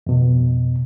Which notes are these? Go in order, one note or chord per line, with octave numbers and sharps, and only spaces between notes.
F2 B2